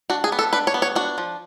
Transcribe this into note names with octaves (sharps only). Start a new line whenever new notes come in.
D4 F#4
G#4
B3
A4
D4 B4
C#5
B3
C#5
D4 F#4
F3